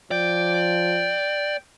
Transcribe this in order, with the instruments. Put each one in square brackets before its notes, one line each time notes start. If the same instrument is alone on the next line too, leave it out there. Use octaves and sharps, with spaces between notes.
[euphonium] F3 [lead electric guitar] D5 [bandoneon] G5